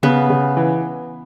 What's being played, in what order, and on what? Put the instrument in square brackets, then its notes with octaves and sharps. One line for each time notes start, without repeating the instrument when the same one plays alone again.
[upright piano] C#3 [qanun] B3
[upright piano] C#3
E3